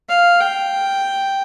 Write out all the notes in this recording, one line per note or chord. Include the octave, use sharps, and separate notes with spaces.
F5
G5